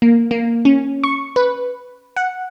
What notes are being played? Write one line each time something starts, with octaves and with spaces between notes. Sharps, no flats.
A#3
A#3
C#4
C#6
B4
F#5